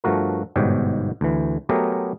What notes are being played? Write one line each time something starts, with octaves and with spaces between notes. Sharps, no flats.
G2 F3 A3 F#4 A#4
G1 G#2 B2 G4 C#5 G5
D2 E3
F#3 A3 B3 G4 G#4 A#4